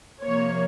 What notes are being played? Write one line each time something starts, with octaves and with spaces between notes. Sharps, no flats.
C3 F3 A#3 C#5